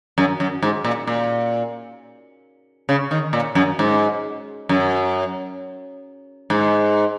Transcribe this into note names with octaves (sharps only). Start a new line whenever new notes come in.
F#2
F#2
G#2
A#2
A#2
C#3
D#3
A#2
F#2
G#2
F#2
G#2